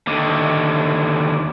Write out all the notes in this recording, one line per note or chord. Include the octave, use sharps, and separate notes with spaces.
D#2 D3